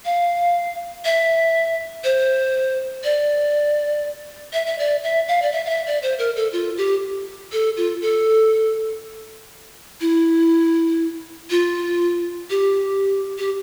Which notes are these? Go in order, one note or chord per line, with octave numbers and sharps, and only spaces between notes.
F5
E5
C5
D5
E5
E5
D5
E5
F5
D5
E5
F5
E5
D5
C5
A#4
A4
F4
G4
A4
F4
A4
E4
F4
G4
G4